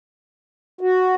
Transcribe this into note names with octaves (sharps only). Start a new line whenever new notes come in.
F#4